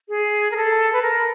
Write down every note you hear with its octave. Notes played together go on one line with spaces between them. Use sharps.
G#4
A#4
A4
B4
A#4